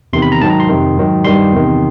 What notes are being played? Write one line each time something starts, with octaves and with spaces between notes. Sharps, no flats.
E2 C3 D#3 C6
B5
A#5
G#2 D#3 F#3 A5
A#5
C6
F2 C3 D#3
G#2 D#3 F#3
G2 D#3 G3 C6
E2 C3 D#3